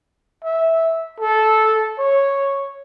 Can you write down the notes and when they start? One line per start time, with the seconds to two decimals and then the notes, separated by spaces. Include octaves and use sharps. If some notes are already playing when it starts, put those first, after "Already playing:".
0.44 E5
1.20 A4
1.98 C#5